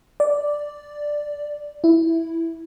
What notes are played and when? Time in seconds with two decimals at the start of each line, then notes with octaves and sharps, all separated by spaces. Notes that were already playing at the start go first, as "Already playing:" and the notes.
0.20 D5
1.84 E4